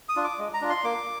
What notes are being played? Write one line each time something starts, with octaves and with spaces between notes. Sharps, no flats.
D#6
D4 F4
D6
G#3
A#5
D4 F4
C6
A#3 D6